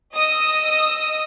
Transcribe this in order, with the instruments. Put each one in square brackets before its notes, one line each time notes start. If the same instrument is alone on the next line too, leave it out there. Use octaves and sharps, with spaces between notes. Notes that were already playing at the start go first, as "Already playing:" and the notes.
[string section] D#5 D#6 E6